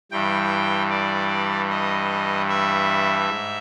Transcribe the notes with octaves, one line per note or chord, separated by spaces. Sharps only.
G2 E3 G5
D5
D#5
E5
G#2